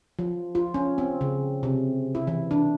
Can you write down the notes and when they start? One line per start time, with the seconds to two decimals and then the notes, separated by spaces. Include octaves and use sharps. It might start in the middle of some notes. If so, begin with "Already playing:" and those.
0.19 F3
0.55 F4
0.74 C#4
0.98 C4
1.21 C#3
1.63 C3
2.15 E4
2.27 E3
2.51 D4